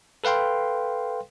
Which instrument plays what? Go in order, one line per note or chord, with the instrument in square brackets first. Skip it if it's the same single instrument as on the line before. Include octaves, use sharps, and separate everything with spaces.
[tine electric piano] A4 B4 F5 G5 C6